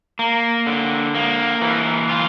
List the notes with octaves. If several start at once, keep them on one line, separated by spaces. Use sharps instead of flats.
A#3
D3
A#3
E3
F4